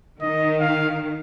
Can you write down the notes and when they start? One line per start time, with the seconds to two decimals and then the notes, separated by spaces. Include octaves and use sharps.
0.21 D#3 D#5
0.61 F5